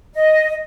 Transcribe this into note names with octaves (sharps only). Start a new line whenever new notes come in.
D#5